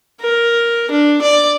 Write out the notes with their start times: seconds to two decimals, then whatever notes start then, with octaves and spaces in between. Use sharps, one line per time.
0.21 A#4
0.91 D4
1.22 D5